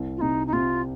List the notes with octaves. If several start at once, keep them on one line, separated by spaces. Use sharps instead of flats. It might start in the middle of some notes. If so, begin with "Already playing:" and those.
Already playing: C2
F4
C3 D#4
D#4
C3 F4